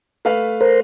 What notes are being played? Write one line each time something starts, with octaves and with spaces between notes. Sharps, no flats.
A3 B4 F5
A#4 C5